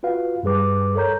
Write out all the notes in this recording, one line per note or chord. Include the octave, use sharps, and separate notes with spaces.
F4 F#4 B4 F5
G2 G3 G#4 B4 D6
A4 A#4 C#5 A#5 G6